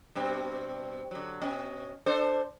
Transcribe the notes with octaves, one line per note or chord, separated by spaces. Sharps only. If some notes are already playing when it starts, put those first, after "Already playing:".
G2 B2 C4
D3 F#3
B2 C#4 D#5
D4 A4 C5